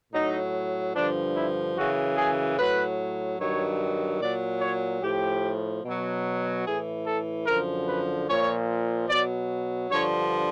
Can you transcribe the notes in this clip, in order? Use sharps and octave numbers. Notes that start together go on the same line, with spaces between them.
A2 F#3 D#4
G2 D3 F3 D4
E4
F#2 C#3 E3 F#4
G#4
A2 F#3 B4
G2 D#3 F#3 C#5
A#2 F#3 D5
C#5
A2 F3 G4
B2 F#3
A2 E3 G#4
A4
F#2 D3 F3 A#4
B4
A#2 F3 C#5
B2 F#3 D5
G2 D3 F3 C#5